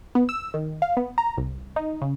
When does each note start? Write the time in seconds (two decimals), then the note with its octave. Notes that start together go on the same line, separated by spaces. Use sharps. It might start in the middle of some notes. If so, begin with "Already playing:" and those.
0.15 B3
0.29 E6
0.54 D#3
0.82 F5
0.97 B3
1.18 A#5
1.37 C2
1.76 D#4
2.01 C#3